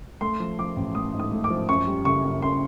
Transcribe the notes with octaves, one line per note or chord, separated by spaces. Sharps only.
A3 C6
F3
F3 D6
A1
A3 D#6
G#2
D#6
A3
D6
F3
F#2 C#6
G3
F#1 C#6
F#2
F#2 C6